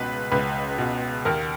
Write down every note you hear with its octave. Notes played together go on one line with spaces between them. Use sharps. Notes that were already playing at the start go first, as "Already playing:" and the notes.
Already playing: C#2 B2 B4
C#2 B4
B2
D#2 A#4